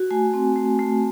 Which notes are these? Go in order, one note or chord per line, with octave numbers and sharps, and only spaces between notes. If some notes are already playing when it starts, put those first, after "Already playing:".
Already playing: F#4
A3 G#5
C4
A3
A3